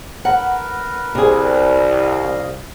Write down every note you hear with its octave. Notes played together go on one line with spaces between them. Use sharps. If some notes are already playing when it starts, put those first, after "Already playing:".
A#4 B4 F#5
C2 C3 G#4
D#5 F5